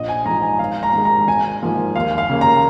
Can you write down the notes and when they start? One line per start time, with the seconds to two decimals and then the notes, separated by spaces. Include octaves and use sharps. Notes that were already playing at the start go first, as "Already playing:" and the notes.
Already playing: A#1 D#5
0.09 G#5
0.26 G#2 F3 A#5
0.42 G#5
0.59 G#1 F5
0.83 A#5
0.93 G#2 D#3 G#3
1.05 A#5
1.27 G#1 G#5
1.62 G#2 F3 A#3
1.96 D#2 F5
2.18 F5
2.30 C#3 A#3
2.41 A#5